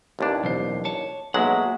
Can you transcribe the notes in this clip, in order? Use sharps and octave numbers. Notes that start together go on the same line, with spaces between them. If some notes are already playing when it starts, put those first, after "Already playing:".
A1 D#2 D4
B1 E2 C5
C#5 A5
B1 F#3 G#3 A#3 E5 F#5